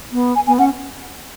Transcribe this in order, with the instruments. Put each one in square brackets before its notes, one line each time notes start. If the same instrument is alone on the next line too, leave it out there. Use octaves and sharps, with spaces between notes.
[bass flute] B3
[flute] G#5
[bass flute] B3 [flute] G#5
[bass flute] C#4 [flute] F#5